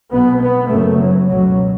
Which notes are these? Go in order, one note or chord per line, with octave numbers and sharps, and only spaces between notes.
B1 B2 B3
B3
F#1 F#2 C#3 A3
F#3
C#2 B2 F#3